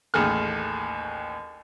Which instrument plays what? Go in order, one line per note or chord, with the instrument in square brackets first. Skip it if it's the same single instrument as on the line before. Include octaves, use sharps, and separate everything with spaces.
[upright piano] A1 D#2 A3 G#4 A4 F6